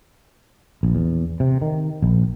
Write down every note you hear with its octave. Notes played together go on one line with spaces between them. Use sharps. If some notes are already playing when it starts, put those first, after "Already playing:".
A#1
E2
C3
D#3
A#1